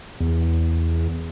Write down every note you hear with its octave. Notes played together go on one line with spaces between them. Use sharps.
E2